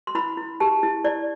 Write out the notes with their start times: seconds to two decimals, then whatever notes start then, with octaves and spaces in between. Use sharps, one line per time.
0.07 C6
0.15 E4 B5
0.37 E4
0.60 G4 A5
0.83 E4
1.04 E4 D5